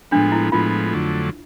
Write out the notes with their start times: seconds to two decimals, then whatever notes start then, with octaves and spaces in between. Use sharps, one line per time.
0.11 A2 F3 G#3 B3 D4
0.32 E4
0.52 A2 F3 G#3 B3 F4
0.93 F2 D3 F#3 A3